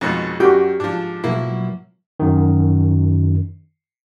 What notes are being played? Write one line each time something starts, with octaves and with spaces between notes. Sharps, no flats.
F2 G#2 B2 G#4 A#4 C#5
F#2 F#4 G4 G5
G#2 F3 D4
B2 F3 F#3 A#3 E4
F#2 D#3